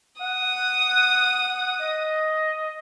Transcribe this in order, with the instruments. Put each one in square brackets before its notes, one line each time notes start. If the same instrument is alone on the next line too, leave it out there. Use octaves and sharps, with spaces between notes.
[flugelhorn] F#5 [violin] D#6
[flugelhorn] D#5